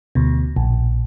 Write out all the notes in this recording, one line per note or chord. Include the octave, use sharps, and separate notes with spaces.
D2 B2
A#1